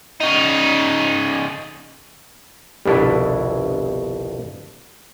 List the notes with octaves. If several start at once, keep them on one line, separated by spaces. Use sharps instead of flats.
C#3 D#4
G1 C2 F2 B2 D4 E4